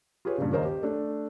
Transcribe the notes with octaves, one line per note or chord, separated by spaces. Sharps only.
F4 G4 G#4 B4 C#5
G2 A#2 C#3
D#2 A#4 C5 D#5
G4
A3 D4